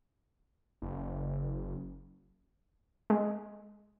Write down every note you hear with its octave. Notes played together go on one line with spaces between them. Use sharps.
F#1
G#3